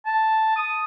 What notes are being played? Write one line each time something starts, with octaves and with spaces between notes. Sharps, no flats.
A5
D#6